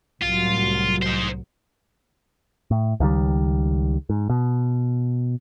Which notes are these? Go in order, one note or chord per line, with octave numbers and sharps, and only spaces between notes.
C2 A2 F#3 F4
D#4 C5
A2
C#2 D#3 E3 G3
G#2
B2